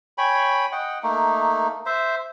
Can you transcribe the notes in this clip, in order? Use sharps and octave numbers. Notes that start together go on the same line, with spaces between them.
C#5 G5 G#5 B5
D#5 F#5 G5
A3 A#3 D#4
C5 E5